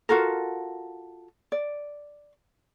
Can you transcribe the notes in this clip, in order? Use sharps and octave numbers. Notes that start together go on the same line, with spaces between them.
F4 F#4 A4 A#4
D5